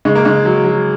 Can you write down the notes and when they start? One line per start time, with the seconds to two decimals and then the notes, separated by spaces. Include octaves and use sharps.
0.05 C#3 G#3
0.15 A#3
0.25 C#3 G#3
0.45 F#3
0.64 F#3